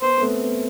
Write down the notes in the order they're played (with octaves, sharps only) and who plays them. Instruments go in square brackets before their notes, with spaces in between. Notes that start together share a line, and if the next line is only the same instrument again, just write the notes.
[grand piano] B3 [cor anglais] C5
[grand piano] B3
A3 C4
B3